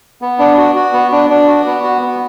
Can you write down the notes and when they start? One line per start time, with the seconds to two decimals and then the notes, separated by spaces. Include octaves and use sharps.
0.22 B3
0.39 D4
0.57 F#4
0.75 F#4
0.93 B3
1.12 D4
1.30 D4
1.47 F#4
1.66 B3
1.83 F#4
2.01 B3